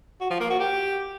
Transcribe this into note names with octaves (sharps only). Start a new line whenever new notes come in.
F#4
F3
A#3
F#4
G4